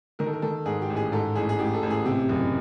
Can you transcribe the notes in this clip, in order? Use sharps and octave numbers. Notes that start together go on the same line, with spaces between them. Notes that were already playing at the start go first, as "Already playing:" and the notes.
D#3 A#4
A4
A#4
D#3 A4
G#2 G#4
G4
A1
G#4
G#2 A4
A1 G#4
G#4
A1 G4
A4
A1
G#4
C3 G4
F#1